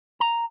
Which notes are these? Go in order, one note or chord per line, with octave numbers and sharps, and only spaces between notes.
A#5